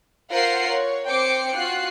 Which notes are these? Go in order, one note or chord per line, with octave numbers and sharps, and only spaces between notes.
F4 A#4 C5 F#5 C7
C#5
C4 C5 G5 D6 C7 C#7
F4 F#4 F#6 C7